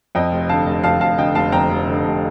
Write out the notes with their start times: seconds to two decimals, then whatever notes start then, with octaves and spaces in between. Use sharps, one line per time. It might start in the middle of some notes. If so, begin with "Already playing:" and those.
0.15 F2 D#5 G5
0.32 F1
0.49 D3 F5 A5
0.66 F1
0.83 F2 F5 A5
1.00 F1 F5 A5
1.18 D3 D#5 G5
1.35 F1 F5 A5
1.52 F2 G5 A#5
1.69 F1
1.87 D3
2.04 F1